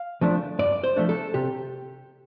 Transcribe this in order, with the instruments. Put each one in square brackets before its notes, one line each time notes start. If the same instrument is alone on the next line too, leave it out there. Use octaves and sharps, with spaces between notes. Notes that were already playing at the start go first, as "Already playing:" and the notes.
Already playing: [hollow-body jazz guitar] F5
F3 A3 D4
G2 D5
C5
F3 A3 D4
A4
C3 G4